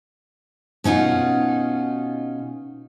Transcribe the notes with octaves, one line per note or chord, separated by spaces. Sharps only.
B2 C#4 D#4 F4 F#5